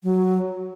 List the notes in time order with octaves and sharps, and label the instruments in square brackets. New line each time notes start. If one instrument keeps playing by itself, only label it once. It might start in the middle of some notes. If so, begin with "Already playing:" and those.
[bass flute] F#3